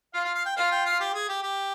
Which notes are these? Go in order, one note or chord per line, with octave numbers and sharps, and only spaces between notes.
F4 F5
F5
F5
G5
F4 F5
G5
F5
G4
G#4
G4
G4